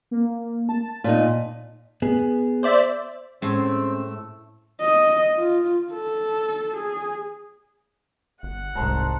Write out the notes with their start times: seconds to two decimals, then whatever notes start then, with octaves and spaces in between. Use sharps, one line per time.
0.11 A#3
0.69 A5
1.04 A#2 D#4
2.02 B3 G#4
2.63 C5 D5 E5
3.42 A2 G#3 A3 C4 C#4 E6
4.81 D#5
5.36 F4
5.92 A4
6.77 G#4
8.43 G1 F#5
8.75 D#1 C2 G#2 C5 A5 A#5